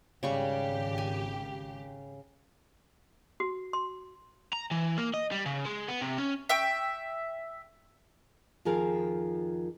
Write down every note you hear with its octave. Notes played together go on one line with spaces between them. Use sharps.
G#1 C#3 G3 G4 C#6
G#5
F#4
C6
A#5
E3
A#3
D#5
G3
C#3
G#3
B3
C3
C#4
E5 G5 C#6
F2 D#3 F3 G#4 A#4 F5